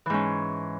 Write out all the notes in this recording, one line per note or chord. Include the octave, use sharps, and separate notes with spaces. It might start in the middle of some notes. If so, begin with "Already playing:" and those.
G#2 E3 C#4